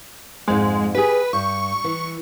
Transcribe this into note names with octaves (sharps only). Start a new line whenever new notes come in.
F2 G#2 G#3
G4 G#4 B4
G2 C#6
E3